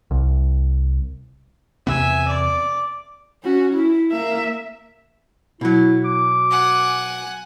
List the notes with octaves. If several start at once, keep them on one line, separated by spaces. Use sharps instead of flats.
C2
E2 C3 B3 E5 G#5
D5 D6
C#4 F#4
E4
A#3 E5
B2 F#3 E4
D6
F#5 G#5